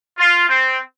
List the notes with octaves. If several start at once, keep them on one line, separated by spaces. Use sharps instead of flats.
F4
C4